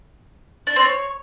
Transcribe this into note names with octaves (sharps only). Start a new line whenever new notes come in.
D4
C4
C#5